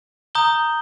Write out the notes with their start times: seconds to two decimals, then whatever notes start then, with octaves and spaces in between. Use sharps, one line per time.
0.35 A#5 D#6 G6 G7